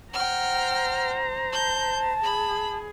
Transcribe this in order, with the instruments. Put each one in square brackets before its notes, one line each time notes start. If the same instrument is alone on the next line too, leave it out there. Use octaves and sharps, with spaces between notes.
[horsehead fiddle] C5 A#5 [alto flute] F#5 [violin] G5 F6
[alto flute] A5 [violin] G6
[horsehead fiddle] G#4 [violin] B5